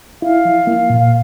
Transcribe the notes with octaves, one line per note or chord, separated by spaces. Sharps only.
E4 F5
F3
A#3
A#2
F5